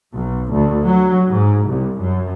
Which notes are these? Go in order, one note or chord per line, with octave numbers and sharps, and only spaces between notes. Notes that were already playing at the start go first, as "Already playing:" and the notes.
B1
D2
F#3
G#2
C2
F#2